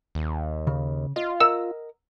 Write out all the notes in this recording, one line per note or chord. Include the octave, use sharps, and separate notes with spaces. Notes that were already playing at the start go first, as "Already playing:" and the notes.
D#2
C#3
F4 D#5
A#4 D#5 F#5 E6